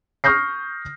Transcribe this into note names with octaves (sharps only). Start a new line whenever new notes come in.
C#6 D#6 F6 G6 A#6 C7